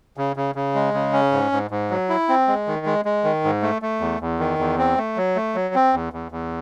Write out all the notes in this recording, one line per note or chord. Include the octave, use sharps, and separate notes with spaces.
C#3
C#3
C#3
G#3
C#3
C#4
G#2
G#2
G#2
F#3
E4
C4
G#3
D#3
G#3
G#3
D#3
G#2
A3
A3
E2
E2
D#3
E2
C4
A3
F#3
A3
F#3
C4
E2
E2
E2